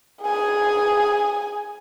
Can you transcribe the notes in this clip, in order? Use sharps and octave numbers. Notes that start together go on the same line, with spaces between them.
G#4 G#5